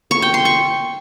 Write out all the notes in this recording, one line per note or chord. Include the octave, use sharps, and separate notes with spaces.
C#6
G5
C6
C#6